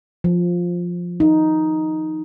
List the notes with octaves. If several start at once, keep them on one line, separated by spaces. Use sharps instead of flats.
F3
D#4